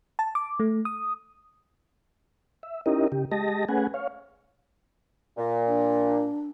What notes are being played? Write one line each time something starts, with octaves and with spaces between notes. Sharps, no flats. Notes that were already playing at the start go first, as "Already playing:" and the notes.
A5
D6
A3
D#6
E5
C#4 D#4 E4 G4 A#4 D#5
C#3 G4
G#3 G4 D#5 A5 A#6
A3 C#4 G#4 B4 F#5 G#5
C#5 F5
A#2
D4